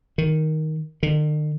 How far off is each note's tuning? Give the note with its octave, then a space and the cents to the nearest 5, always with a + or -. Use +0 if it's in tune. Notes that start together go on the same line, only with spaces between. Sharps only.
D#3 +5
D#3 -45